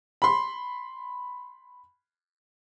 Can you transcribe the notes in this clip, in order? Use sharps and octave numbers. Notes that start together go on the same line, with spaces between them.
B5 C6